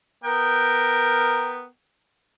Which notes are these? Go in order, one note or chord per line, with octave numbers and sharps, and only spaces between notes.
B3 A#4 G5